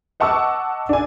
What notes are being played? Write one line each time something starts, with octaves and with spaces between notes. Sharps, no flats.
D#5 F#5 A5 C#6 D6 E6
D4 G#5